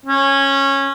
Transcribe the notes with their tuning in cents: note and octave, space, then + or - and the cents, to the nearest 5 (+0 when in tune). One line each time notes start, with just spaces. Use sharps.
C#4 -15